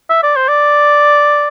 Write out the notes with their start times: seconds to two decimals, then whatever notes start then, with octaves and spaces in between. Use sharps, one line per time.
0.10 E5
0.23 D5
0.36 C5
0.48 D5